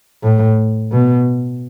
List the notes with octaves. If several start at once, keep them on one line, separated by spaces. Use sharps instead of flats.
A2
B2